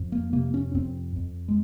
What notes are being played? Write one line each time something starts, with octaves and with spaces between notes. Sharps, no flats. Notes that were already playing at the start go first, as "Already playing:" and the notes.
Already playing: F2
A#3
C3 A#3
C#4
F2 C4
F2
G#3